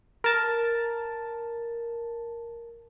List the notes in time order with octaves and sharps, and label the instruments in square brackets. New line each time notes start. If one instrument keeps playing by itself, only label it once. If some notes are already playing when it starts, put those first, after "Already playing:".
[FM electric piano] A#4 A5